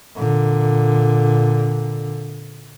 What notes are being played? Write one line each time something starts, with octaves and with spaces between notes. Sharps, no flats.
A#2 D3